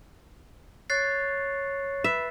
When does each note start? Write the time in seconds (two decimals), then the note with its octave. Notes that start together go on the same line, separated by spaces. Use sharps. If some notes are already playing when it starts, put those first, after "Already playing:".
0.90 C#5 F#6 A6 C7
2.04 B4 E5